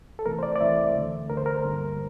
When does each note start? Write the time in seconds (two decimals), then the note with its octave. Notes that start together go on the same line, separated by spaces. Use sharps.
0.19 A4
0.25 C2 C3 E3 A3 A#4
0.39 C5
0.43 D5
0.56 D5
0.60 C2 C3 E3 A3 E5
0.95 D2 D3 A3
1.29 D2 D3 A3 A#4
1.37 C5
1.46 A#4
1.64 G2 D3 G3 A#3